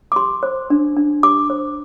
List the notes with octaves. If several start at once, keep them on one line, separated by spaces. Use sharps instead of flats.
D6
G4 C6
C5
D4
D4
G4 D6
C5